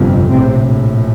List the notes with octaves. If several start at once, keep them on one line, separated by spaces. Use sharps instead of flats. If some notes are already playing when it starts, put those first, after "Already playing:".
Already playing: G1 F2 C3
A#1 A2 C3 C4